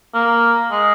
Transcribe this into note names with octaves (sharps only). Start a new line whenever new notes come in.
A#3
G#3